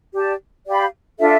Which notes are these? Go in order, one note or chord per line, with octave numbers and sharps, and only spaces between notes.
G4 D5 A5
G4 D5 F5 B5
D4 F4 A4 E5